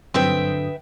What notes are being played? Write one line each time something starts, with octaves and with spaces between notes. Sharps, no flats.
G2 D3 F#3 C4 B4 E5 G5 D#6